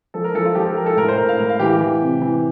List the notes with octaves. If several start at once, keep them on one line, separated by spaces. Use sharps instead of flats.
F3 A4
A#4
F3 A4
F4
F3 G4
A4
F3 A#4
A4
A2 A#4
C5
A2 A#4
F5
A2 A#4
F5
E3 G4
G4
E3
C3
E3